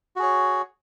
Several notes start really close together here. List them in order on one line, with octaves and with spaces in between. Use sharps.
F#4 G#4 C#5